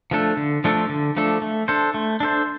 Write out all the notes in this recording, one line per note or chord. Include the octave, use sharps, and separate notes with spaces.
F3 A3 D4 A4
D3
F3 A3 D4 A4
D3
F3 A3 D4 A4
A3
D4 A4 C5
A3
D4 A4 C5